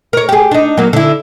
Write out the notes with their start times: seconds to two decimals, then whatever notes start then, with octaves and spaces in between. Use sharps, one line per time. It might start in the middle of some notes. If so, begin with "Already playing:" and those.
0.13 A#4 C#5
0.29 G4 G#4
0.51 D4 D#4
0.77 F#3 A#3
0.93 D3 E4